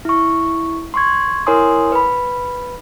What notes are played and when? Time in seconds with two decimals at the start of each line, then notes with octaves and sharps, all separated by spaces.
0.05 E4 C#6
0.94 C6 C#6 G#6
1.47 E4 A#4 C#5 G#5 C6 D#6
1.92 B4 B5